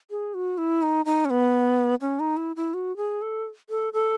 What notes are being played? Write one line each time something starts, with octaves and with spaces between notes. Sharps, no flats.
G#4
F#4
E4
D#4
D#4
C#4
B3
C#4
D#4
E4
E4
F#4
G#4
A4
A4
A4